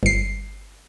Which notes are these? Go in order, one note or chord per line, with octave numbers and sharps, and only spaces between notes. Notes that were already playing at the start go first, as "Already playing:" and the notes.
G1 C7